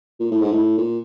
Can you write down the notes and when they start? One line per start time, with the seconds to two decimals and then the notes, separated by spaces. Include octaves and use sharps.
0.20 A#2
0.31 A2
0.41 G#2
0.51 A2
0.78 A#2